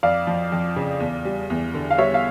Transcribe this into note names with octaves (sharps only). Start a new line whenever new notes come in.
F2 D5 F5
F3
F2
C#3
E2
G3
E2
D3
F5
G3 C#5 E5
F5